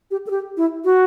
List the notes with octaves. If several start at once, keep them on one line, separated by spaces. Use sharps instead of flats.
G4
A4
G4
E4
F#4